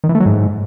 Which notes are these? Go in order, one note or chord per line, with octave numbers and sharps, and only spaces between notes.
D#3
E3
A3
F#3
G#2